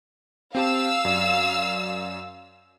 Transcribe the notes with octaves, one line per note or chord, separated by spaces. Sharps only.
C4 G4 F5 A5 E6
F#2 D5